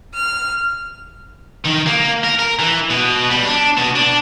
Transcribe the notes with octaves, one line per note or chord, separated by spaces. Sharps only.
F6
D#3
A#3
A#4
A#4
E3
B2
G3
D4
B2
D4